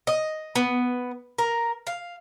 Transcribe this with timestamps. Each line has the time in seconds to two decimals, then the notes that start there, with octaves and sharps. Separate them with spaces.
0.07 D#5
0.55 B3
1.38 A#4
1.87 F5